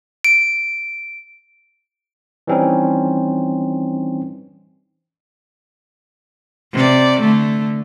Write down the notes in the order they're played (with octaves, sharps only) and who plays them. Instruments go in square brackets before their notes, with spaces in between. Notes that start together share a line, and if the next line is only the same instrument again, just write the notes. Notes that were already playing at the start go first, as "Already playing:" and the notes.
[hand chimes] D7
[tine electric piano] E3 G3 C4 C#4 D#4
[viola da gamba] C3 D5
D3 A3